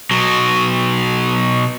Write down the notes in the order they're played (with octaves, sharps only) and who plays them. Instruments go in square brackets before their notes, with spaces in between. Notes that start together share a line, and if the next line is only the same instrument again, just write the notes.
[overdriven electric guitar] B2 F#3